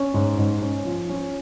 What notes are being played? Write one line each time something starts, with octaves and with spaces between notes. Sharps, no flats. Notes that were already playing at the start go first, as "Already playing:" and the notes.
Already playing: C#4
G#2
G#2
C#4
F3
C#4